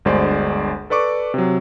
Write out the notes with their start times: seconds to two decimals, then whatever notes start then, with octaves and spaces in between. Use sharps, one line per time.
0.05 G1 D2 G#3 C5 D5
0.90 A4 B4 D5 C#6 D6
1.34 C3 F#3